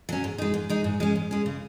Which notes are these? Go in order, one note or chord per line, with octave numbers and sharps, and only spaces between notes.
F#3 C#4
G#2
G#3 D#4
G#2
G#3 D#4
G#2
G#3 C#4
G#2
G#3 C#4
C#3